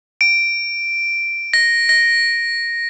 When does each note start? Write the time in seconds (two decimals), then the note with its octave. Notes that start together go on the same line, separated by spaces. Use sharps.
0.21 D7
1.53 A#6
1.89 A#6